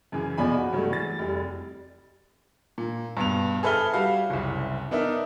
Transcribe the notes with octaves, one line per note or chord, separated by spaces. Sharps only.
F#2 C#3 E3
B1 B2 F3 D5 G#5 B5
F#4
G2 F#3 G#3 A3
E3 A6
F1 G3
A#2
G2 B2 F7
G#4 A4 B4 E5 F6 G7
G3 F#4 F5
F#1 C2
B3 D4 D#4 A#4 E5